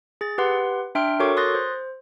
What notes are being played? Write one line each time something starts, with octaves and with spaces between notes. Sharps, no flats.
G#4 A6
G4 B4 F#5 C6
D4 E5 G5 C6 F6 D7
F#4 A4 A#4 C#5 C#6 D6
C6 D#6 F#6 A6 A#6
C5